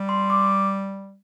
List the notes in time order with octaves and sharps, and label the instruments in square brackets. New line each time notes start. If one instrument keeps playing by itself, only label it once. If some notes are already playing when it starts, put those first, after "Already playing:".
Already playing: [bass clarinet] G3
[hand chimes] C6
D6